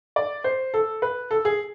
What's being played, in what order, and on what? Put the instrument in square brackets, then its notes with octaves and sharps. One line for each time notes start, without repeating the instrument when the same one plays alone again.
[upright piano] D5
C5
A4
B4
A4
G#4